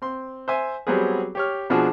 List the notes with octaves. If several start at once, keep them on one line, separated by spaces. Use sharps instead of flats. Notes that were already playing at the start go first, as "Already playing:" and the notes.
C4 C6
C5 E5 G#5
F#3 G3 B3 C4 G#4
G4 C#5 F6
B2 F3 D4 F#4 G#4